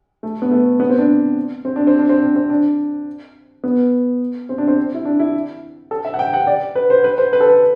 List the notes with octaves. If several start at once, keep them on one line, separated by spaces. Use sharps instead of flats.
A3
B3
A3
B3
C4
D4
C4
D4
C4
D4
C4
D4
C4
D4
B3
C4
D4
C4
E4
D4
E4
A4
E5
F#5
G5
F#5
D5
B4
C5
B4
C5
B4
A4
B4